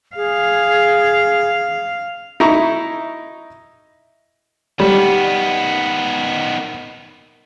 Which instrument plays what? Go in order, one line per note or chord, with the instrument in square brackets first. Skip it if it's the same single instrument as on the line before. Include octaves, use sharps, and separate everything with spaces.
[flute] G#4 [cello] F5
[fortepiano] D#4 E4 A#5 C#6
[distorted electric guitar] D#3 B3 [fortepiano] G3